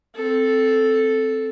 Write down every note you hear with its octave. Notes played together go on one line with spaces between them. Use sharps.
C4 A4